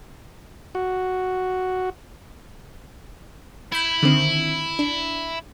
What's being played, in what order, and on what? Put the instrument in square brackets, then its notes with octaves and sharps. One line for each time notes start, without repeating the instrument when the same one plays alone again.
[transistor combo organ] F#4
[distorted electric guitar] E4 [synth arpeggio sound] B5 G6 G#6
[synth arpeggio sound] D3 D#3 C4
D4